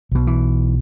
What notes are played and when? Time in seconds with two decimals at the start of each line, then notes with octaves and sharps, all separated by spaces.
0.12 B1 B2
0.27 E3